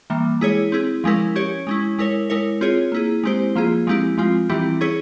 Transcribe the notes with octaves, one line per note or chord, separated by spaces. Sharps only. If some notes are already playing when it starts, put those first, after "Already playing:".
E3 G3 A#3
G#3 E4 G#4 C#5
C4 E4 G#4
F3 G#3 C#4 E4 A#4
C#4 G4 C#5
G#3 C#4 E4
G#3 E4 A#4 C#5
G#3 E4 A#4 C#5
C4 F4 G#4 C#5
A#3 E4 G#4
G#3 C4 E4 G4 C5
F3 A#3 F4 G#4
F3 G#3 C4 E4 G4
F3 G#3 C4 F4
E3 G3 C4 E4 G4
C#4 E4 G#4 C#5